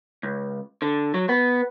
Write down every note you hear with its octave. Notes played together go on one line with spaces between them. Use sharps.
C#2
D3
F#3
B3